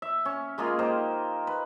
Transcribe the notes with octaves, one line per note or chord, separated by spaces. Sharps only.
E5
C#4
G#3 A#3 F4 G#4
D#4 G4 C5
B4